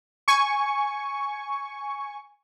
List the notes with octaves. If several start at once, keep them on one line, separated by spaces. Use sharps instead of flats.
G#5 C#6